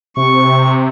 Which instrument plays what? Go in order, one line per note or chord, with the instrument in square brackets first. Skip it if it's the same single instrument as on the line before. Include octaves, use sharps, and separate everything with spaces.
[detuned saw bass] C3 [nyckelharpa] C#6